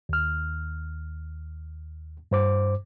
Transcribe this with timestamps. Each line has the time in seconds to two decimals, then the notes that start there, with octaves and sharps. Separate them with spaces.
0.09 D#2 F6
2.31 G2 C5 D6